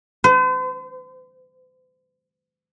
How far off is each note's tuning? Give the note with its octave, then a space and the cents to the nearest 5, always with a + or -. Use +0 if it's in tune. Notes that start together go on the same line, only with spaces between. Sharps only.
C5 -45